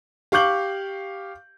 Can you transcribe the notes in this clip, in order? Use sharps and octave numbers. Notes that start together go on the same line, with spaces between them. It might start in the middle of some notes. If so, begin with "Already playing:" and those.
G4 F5 C#6 D6 G6 F#7